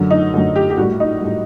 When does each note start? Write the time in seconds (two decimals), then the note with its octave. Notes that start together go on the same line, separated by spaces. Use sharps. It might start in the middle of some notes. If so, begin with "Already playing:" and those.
Already playing: F#2 D3 F#3
0.11 D#4
0.34 F#2 D3 F#3
0.56 G4
0.70 G4
0.78 A2 G3 F#4
1.00 D#4
1.21 A2 G3